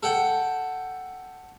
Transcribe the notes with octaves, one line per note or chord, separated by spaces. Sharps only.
A4 F#5 G5